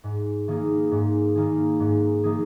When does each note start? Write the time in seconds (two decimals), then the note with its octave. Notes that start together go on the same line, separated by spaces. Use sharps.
0.04 G#2
0.48 D#3 A#3 D#4 G#4
0.91 G#2
1.35 D#3 A#3 D#4 G#4
1.80 G#2
2.23 D#3 A#3 D#4 G#4